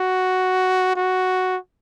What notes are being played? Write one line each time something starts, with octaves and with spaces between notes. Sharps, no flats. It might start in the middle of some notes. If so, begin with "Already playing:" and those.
Already playing: F#4
F#4